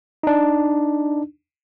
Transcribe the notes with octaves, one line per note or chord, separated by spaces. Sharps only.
D4 D#4